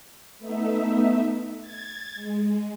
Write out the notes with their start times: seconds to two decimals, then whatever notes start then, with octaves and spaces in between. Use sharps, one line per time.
0.39 A3 B3 D#4 E5
1.60 G#6 A6
2.15 G#3